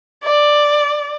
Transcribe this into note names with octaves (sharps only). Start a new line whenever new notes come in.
D5